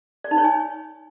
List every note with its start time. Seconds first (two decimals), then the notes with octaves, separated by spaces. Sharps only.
0.24 D5
0.31 D#4
0.38 C#5
0.44 G#5